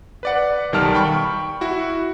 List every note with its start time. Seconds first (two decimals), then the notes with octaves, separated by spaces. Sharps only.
0.23 B4 D5 F#5
0.72 B1 D#3 G3 A5 F6
0.95 G5 B5 C#6
1.61 E4 F#4